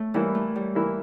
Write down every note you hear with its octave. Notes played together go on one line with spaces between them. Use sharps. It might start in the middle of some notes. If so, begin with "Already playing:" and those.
Already playing: A3
E3 G3 A#3 E4
A3
G3
E3 A#3 E4